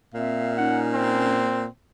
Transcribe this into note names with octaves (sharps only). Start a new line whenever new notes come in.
A#2 C4 E5 F5
C#4 D#4 F#5
C4